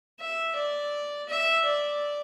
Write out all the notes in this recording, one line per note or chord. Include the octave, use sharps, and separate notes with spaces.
E5
D5
E5
D5